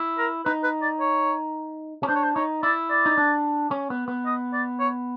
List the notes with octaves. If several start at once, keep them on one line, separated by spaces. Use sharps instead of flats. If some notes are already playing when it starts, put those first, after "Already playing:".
Already playing: E4
A#4
D#4 B4
B4
D5
C#5
C#4
D4 C5
C#5
C5
D#4 C#5
E4 D5
D5
D#4
D4
C#4
B3
B3
D#5
D5
C#5